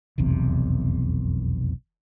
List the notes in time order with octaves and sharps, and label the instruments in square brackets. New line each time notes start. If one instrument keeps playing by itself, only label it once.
[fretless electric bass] F1 B1 E2 C3